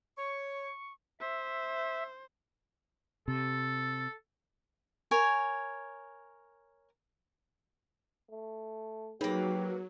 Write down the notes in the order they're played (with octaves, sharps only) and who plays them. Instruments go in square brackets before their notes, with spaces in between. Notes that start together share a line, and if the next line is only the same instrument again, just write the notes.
[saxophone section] C#5 [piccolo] C#6
[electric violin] C5 [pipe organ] E5
[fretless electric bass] C3 [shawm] A4
[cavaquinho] A#4 C#5 G#5
[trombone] A3
[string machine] F#3 [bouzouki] A#3 B4 [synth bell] D#4 G#4 C#5 [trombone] G4